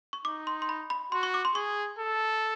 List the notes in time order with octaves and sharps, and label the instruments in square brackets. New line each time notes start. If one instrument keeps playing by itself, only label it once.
[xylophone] C#6
[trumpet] D#4 [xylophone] D6
[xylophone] C6
C6
B5
B5
[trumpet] F#4 [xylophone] C6
[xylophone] C#6
D6
C6
[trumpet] G#4 [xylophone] C#6
[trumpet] A4